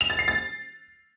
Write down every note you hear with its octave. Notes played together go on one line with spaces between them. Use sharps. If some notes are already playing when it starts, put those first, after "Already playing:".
F7
A6
C7
A6